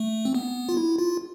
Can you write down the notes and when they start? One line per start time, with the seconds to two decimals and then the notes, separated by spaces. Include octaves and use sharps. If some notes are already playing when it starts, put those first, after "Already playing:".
Already playing: A3
0.25 C4
0.34 B3
0.69 F4
0.77 E4
0.98 F4